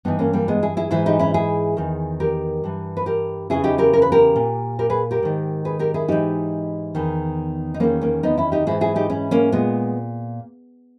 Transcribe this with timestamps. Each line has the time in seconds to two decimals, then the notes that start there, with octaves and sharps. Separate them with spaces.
0.05 G2 E3 B3 D#4
0.19 A#3 C#4
0.33 G3 A#3
0.48 G#3 B3
0.63 E4 G#4
0.77 E4 G#4
0.91 G#2 E3 E4 G#4
1.06 D#4 G4
1.19 C#4 E4
1.34 E4 G#4
1.77 E2 D#3
2.20 G4 A#4
2.64 G2 E3
2.97 B4
3.06 G4 A#4
3.50 E2 C#3 E3 E4 G#4
3.64 D#4 G4
3.78 G4 A#4
3.93 A#4
4.02 B4
4.12 G4 A#4
4.36 A#2
4.79 G4 A#4
4.90 G#4 B4
5.11 G4 A#4
5.23 G#2 D#3
5.65 G#4 B4
5.79 G4 A#4
5.94 E4 G#4
6.08 G#2 E3 D#4 G4
6.95 E2 D#3
7.74 D#4
7.80 E2 D#3 A#3 C#4
8.01 A#3 C#4
8.23 B3 D#4
8.38 C#4 E4
8.52 D#4 G4
8.67 G#2 E3 E4 G#4
8.81 E4 G#4
8.96 D#4 G4
9.10 C#4 E4
9.31 A#3 C#4
9.52 A#2 G#3 B3